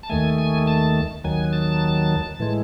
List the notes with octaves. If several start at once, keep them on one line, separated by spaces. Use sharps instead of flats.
A5
D#2 D#3 A3 G#5
G#5
A5
D#2 D#3 F#3 G#5
A5
A2 E3 G#3